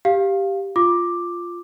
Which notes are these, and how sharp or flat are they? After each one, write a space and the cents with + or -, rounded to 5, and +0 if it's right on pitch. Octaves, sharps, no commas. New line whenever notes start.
G4 +0 F5 +0
F4 +0 D6 +5